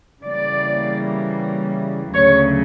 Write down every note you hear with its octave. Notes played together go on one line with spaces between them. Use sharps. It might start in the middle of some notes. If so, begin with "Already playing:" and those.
C#3 E3 G3 A#3 D5
D2 C#3 F#3 C#5